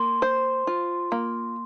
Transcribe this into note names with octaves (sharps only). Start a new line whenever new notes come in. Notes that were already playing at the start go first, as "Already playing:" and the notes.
Already playing: A#3 C6
C5
F4
A#3